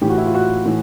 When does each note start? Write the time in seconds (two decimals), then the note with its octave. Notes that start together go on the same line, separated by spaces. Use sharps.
0.01 A2 E3 G4
0.10 F#4
0.18 E4
0.26 F4
0.34 F#4
0.66 A2 E3